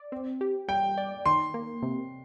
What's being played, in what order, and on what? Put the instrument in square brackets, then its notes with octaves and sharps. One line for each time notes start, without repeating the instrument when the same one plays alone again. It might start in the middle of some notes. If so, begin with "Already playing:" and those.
Already playing: [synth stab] D5
C4
G4
[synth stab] G3 [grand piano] G5
[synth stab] D5
[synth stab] D#3 [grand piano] C6
[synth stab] A#3
C3